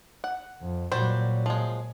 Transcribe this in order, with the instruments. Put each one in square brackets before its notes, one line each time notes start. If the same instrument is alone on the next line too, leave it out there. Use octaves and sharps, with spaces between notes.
[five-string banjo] F#5
[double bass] F2
[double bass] A#2 F#3 [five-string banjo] G3 F#4 C5
[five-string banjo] F3 G#3